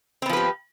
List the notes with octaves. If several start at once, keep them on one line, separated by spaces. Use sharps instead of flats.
F3 B3 C4 G4 B4